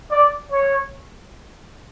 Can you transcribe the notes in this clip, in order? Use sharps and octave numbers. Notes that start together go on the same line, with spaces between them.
D5
C#5